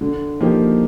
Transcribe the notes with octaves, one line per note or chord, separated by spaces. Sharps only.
D3
F3 A#3 D#4 G4